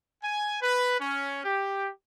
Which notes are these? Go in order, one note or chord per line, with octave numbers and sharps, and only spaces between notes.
G#5
B4
C#4
G4